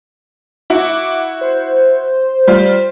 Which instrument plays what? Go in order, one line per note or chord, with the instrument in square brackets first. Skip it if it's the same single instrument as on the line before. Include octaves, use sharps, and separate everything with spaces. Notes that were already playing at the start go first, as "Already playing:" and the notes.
[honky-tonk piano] E4 F#4 [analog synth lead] D6
[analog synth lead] C5
[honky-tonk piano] G3 F4